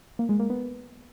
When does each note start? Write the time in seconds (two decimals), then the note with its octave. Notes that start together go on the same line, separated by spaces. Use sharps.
0.19 A#3
0.29 G#3
0.40 A#3
0.50 B3